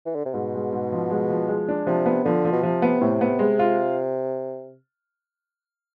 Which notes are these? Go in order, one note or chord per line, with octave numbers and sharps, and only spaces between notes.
E3
D3
C3
G#2 B2
G#3
G#2
F3
G#3
F3
G#3
D4
C3 F3
B3
D3 F3
F3
B2
C3 F3
B3
A2 C3
B3
C3 G#3
F4